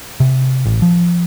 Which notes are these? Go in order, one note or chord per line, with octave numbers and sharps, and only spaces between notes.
C3
A1
F3